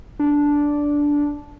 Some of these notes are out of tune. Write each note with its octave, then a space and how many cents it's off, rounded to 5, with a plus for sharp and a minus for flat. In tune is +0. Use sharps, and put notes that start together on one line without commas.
D4 -10